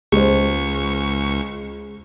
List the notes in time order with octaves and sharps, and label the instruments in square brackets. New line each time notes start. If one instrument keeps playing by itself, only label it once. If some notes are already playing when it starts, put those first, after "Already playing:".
[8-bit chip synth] C#2 C#6 [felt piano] G#3 C5